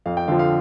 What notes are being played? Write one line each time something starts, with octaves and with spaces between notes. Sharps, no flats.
F2 F5
G5
D3 F3 F5
F5